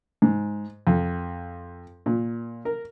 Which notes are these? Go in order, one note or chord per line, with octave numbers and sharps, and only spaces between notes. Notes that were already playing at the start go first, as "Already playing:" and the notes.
G#2
F2
A#2
A#4